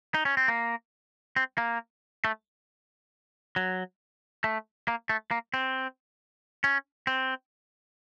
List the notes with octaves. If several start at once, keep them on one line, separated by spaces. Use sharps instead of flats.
D#4
C#4
C4
A#3
C4
A#3
A3
F#3
A3
A#3
A3
A#3
C4
C#4
C4